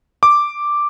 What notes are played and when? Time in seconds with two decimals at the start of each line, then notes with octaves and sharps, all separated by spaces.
0.23 D6